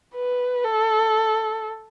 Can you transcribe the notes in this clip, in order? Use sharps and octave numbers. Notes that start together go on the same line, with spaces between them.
B4
A4